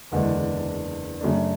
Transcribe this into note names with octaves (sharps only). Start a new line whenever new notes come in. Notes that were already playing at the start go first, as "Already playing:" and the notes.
F#1 E2 D3 G#3 D4
F#2 C#3 F#3 A3 D4